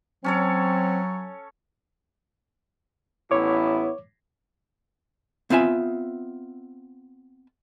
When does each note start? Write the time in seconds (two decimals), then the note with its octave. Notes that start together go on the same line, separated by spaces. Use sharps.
0.24 F#3 C4 C#4 A4 C#5
3.31 A1 B3 E4 C#5 D6
5.50 B3 C4 F4 E5 G#5